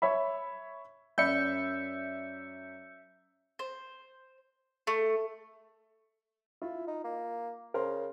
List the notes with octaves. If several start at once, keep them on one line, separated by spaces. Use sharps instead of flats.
C#5 E5 B5
F#2 D5 E5 B5 G6 C#7
C5
A3
E4 F4
D#4
A#3
C#3 A#4 C5 C6